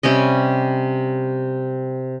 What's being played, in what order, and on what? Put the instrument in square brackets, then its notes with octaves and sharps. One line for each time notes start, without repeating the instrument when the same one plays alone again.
[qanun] C3 G3 C#4 D#5